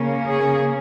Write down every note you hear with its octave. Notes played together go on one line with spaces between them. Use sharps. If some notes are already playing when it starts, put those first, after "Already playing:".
Already playing: C#3 A#3 C#4
G#4